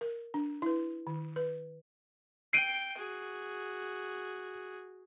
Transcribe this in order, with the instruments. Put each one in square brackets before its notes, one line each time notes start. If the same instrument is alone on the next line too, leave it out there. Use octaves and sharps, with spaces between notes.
[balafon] A#4
D4
E4 B4
D#3
B4
[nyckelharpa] G5 [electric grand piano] C7 D7 D#7
[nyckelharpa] F#4 G#4